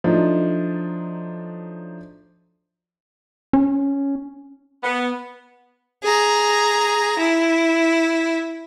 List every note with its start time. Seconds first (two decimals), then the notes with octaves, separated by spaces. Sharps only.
0.04 F3 F#3 A3 D4 D#4
3.53 C#4
4.83 B3
6.03 G#4 A#5
7.19 E4